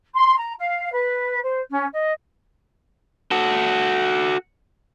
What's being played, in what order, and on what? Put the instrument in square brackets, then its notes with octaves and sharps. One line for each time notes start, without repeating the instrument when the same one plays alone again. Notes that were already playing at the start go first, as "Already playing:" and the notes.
[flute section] C6
A#5
F5
B4
C5
C#4
D#5
[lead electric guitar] F#4 A4